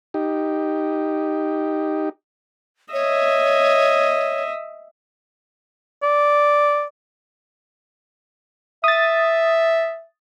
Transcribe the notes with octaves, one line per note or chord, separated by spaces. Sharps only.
D#4 G4
C#5 D#5 E5
D5
E5 D#6 A6